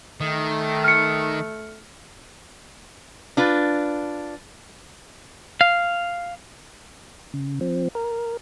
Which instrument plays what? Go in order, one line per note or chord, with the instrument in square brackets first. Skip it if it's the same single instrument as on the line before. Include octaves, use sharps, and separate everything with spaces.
[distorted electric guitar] D#3 [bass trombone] A3
[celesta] F6 C#7
[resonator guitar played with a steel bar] D4 F4 B4
[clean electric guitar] F5
[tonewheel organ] C#3
F3 C4
A#4